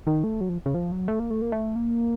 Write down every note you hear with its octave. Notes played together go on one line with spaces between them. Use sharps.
D#3
A3
F#3
F3
C#3
F3
F#3
A3
A#3
A3
A#3
A3
A#3